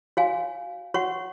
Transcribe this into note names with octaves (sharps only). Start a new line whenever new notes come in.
F#4 C#5 F5 G#5
F#4 C#5 F#5 C#6